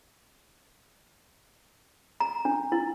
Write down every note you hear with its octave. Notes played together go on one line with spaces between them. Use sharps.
A#5
D4
E4